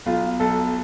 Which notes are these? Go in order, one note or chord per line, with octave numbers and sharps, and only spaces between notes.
B1 F4
B1 A4